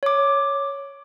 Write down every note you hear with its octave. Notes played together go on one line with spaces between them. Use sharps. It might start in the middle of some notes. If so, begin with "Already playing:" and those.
C#5 D6